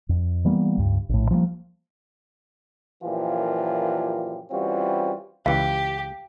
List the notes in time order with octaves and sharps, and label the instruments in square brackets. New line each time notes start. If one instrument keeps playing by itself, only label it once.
[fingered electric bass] F2
E3 G3 A#3 B3
C#2 G2
A#1 A2
F3 G3 G#3 A#3
[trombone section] F#2 A#2 E3 F3 F4 G4
E3 G3 C4 C#4 F4 F#4
[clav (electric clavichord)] C#2 E3 [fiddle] G4 [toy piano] F5